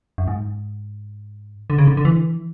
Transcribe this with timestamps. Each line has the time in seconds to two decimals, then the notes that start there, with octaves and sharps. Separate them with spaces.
0.18 F#2
0.28 G#2
1.70 D3
1.78 C#3
1.87 D3
1.97 D3
2.05 E3